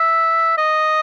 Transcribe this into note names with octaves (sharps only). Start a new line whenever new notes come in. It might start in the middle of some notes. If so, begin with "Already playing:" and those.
Already playing: E5
D#5